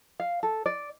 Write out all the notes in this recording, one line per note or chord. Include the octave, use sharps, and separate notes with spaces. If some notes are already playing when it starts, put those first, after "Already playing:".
F5
A4
D5